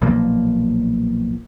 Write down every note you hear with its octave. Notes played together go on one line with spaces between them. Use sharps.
B1 A#2 F3 A#3